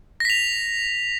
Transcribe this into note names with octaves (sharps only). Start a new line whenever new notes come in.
A#6 B6 F7